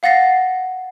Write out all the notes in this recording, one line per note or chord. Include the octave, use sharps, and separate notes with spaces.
F5 F#5 A6 A#6 C7